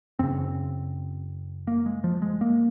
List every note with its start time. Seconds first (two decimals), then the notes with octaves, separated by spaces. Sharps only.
0.19 F#2 C#3 C4
1.67 A#3
1.86 G#3
2.04 F3
2.22 G#3
2.41 A#3